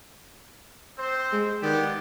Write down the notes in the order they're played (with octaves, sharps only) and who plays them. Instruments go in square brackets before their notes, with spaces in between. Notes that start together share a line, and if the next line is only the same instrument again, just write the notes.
[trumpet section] C4 C5
[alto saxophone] G#3
[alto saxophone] D#3 [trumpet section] B3 G4 D5